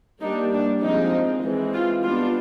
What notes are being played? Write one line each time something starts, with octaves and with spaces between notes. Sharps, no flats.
G3 A#3 D4 D#4
D4
F3 G#3 C4 D#4
E3 G#3 C4
F4
G3 B3 D4 F4